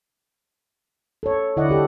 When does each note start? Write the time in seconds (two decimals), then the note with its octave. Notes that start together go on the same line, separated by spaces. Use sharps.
1.23 A4 C#5
1.57 D3 E4 D5 D#5 F#5
1.69 D4 G4 A4